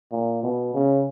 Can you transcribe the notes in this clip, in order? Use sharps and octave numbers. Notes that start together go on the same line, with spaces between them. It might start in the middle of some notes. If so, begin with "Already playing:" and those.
A#2
B2
C#3